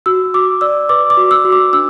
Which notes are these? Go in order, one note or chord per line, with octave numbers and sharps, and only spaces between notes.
F#4 E6
F#4 D6
D5 E6
B4 D6
D6
F#4
E6
F#4
D6
D4 E6